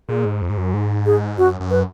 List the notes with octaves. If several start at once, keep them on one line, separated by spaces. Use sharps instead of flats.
A#2 G#4
G#2
F2
G#2
F#2
G#2
G#4
F#2 F#4
F#2
B4